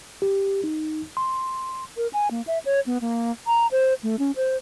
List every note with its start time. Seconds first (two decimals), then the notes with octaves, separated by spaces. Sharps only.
0.22 G4
0.64 D#4
1.17 C6
1.97 A#4
2.13 G#5
2.31 A#3
2.47 E5
2.65 C#5
2.86 B3
3.01 A#3
3.47 A#5
3.71 C5
4.03 A3
4.19 C#4
4.36 C5